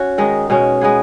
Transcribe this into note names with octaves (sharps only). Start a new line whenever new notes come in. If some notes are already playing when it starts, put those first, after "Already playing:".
Already playing: C#4 F#4
D#3 G#3 D#4
B2 G#3 C#4
G#3 B3 G#4